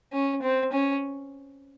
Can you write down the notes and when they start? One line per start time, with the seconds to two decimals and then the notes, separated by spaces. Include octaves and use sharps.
0.13 C#4
0.42 C4
0.73 C#4